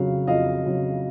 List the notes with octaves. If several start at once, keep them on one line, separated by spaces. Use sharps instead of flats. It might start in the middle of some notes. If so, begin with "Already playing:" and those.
Already playing: F2 C#3 F#3 F5
F2 D#5 F5
C#3 F#3